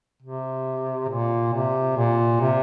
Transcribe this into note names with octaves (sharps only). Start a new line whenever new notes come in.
C3
A#2
C3
A#2
C3